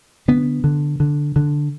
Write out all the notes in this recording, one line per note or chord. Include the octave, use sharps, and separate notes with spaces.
D3 B3
D3
D3
D3